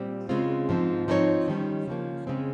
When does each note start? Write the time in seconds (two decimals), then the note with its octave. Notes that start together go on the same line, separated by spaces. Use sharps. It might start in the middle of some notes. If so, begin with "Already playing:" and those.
Already playing: A#2 G3 C4
0.29 C#3 G#3 C4 F4
0.69 G#2 F3 C4
1.08 F3 C4 D#4 A#4 C#5
1.48 D#3 G3 C#4
1.87 C#3 F3 A#3
2.27 C#3 G#3 C4